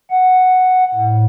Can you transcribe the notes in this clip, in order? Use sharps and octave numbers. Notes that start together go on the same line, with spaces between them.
F#5
A2